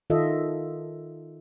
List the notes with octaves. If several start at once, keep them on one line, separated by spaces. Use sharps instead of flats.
D#3 F4 A4 D#5 E5